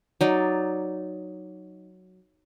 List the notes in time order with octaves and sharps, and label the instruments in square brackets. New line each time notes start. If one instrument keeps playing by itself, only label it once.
[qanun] F#3 D#4 D5